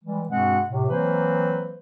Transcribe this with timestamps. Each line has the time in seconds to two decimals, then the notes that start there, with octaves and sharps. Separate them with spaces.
0.04 E3 G3 G#3
0.28 G2 B2 G#3 C4 F#4 F#5
0.69 A2 C3
0.88 E3 F#3 A#3 C4 B4 C5